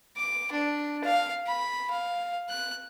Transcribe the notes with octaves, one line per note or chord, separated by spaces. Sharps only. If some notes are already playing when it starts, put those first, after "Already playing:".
D6
D4
F5
B5
F5
F#6